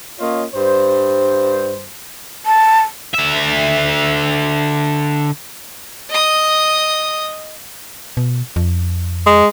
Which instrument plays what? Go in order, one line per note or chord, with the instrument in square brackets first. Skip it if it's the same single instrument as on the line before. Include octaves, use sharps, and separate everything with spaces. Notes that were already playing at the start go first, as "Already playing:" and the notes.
[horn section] A#3 C#4 F4 C#5 D#5
G2 C5
[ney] A5
[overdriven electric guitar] D3 E5
[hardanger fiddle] D#5 D#6
[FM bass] B2
F2
[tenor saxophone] G#3